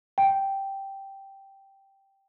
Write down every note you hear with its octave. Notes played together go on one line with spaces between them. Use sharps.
G5